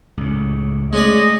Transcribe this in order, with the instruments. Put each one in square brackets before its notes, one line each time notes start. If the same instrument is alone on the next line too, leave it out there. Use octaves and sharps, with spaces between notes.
[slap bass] C#2 A2
[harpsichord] G#3 C#4 D5 [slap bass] A3 [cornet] D#5